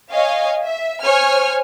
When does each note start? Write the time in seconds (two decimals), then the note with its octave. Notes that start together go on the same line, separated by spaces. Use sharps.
0.11 C#5 D#5 F5 G#5
0.64 E5
1.02 C5 C#5 G#5 F6